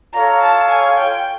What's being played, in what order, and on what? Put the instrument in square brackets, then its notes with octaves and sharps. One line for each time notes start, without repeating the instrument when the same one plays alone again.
[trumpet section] F4 A4 C#5 F5 [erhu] A#5
[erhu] A5
G#5
G5